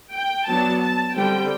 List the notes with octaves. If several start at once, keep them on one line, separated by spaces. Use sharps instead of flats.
G5
F#3 B3 D4 A5
A5
D3 G3 C4 G5